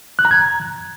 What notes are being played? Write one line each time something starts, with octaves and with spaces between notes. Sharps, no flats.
F#6
A#5
G#6